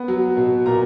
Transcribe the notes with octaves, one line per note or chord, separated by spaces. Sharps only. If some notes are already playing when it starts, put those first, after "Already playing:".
Already playing: B3
F#3
B2
A#2 A#5